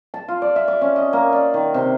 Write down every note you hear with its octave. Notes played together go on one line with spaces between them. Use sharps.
A5
F4
D5
E5
D6
C#4
D#5
A#3
D5
D#3
C3